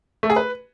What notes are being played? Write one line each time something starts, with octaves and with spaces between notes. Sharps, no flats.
A3
G#4
B4